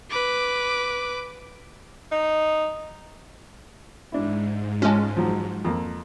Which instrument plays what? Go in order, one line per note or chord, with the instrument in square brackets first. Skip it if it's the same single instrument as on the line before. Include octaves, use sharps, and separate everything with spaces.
[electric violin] B4 D6
[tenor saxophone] D#4
[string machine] G#2 [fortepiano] D4 E4
[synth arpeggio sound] G#3 C#4 [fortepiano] F4 A5
[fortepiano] F3 F#3
F2 A#3